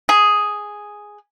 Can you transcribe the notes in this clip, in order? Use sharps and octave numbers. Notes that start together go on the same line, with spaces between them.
G#4